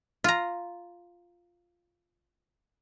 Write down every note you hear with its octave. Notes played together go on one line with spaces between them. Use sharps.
F4 A#5